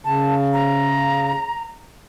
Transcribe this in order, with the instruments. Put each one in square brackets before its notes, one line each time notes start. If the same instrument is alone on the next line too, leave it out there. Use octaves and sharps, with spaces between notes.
[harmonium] C#3 [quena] A5
[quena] A#5